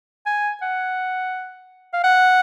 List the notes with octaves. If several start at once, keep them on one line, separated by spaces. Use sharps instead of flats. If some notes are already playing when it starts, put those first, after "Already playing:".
G#5
F#5
F5
F#5